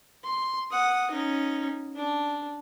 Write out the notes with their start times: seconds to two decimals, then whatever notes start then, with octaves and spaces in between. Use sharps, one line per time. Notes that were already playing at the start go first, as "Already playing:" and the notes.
0.24 C6
0.71 F#5 D#6
1.11 C#4 D#4
1.95 D4